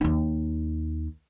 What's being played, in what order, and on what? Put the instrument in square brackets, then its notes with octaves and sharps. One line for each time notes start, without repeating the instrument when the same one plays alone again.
[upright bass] D#2 D#4